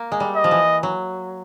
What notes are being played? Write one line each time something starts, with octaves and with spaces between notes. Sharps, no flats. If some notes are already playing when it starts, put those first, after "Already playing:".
Already playing: A#3
G#3
G3
D#5
F3
E3
F#3